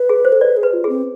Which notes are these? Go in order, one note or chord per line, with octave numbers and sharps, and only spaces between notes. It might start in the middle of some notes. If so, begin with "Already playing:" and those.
Already playing: B4
G#4
C5
A4
B4 D5
G#4
B4
F4
C4 G#4